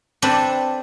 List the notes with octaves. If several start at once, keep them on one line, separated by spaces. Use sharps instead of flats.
C4 D4 A4 B4